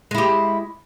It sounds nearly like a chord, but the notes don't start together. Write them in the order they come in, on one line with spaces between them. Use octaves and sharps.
G#3 E4 G4